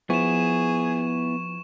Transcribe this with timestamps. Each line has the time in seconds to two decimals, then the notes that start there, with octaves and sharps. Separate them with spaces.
0.10 F3 B3 E4 G#4 C#6 E7